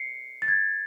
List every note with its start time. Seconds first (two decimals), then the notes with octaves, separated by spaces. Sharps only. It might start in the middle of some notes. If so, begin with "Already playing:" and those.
Already playing: C7 C#7
0.42 A6
0.48 G#6